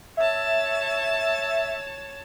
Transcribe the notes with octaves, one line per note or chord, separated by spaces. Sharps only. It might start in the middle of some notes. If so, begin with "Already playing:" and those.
C#5 E5 A5